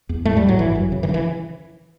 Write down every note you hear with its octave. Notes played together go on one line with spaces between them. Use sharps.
E2
A2 A3
G3
A2
F#3
G1 E3
F#2
C#3
E3
C#3
E3